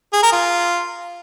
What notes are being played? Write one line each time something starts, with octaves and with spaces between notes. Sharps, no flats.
G#4
A#4
F4